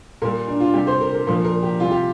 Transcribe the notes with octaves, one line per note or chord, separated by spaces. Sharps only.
A#2 G3 A#4
D4
F4
C3 G3 G4
C5
A#4
A#4
A#2 F3 A#4
A#4
G4
C3 G3 F4
G4